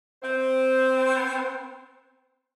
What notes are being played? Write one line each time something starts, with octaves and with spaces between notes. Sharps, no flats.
C4 C5